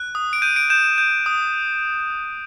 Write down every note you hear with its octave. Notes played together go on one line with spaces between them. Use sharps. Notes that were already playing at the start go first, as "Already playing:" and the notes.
Already playing: F#6
D#6
D7
G6 D#7
D7
G6 E7
E7
G6
D#6